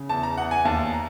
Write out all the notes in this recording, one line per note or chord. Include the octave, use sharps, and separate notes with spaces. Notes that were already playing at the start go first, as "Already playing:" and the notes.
Already playing: C#3
E2 A5
A#5
E2 F#5
G#5
D#2 A5
A#5